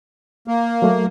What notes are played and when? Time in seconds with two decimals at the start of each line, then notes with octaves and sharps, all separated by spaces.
0.48 A#3
0.82 F#3 A3